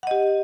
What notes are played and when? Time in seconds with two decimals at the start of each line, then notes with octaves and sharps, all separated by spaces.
0.03 F#5
0.07 D#5
0.11 G4